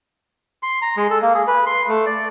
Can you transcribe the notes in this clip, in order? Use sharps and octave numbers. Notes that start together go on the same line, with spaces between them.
C6
A#5
G#3
A4
A#3
G#4
B4
C6
A3
D5